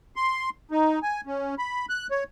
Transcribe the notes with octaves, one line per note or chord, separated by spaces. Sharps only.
C6
D#4
G#5
C#4
B5
F#6
C#5